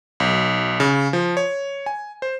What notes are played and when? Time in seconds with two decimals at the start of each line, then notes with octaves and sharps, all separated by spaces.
0.20 B1
0.80 C#3
1.13 F3
1.37 C#5
1.86 G#5
2.22 C5